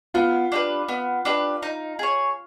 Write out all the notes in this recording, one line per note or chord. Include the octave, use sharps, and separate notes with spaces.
B3 F4
D4 G4 B4
B3
D4 G4 B4
D#4
G#4 C#5